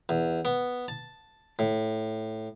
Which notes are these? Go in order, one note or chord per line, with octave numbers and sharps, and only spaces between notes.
E2
B3
A5
A2